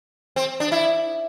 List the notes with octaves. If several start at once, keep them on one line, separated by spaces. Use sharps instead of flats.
C4
D4
E4